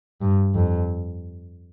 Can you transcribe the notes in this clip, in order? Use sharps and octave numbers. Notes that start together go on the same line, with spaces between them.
G2
F2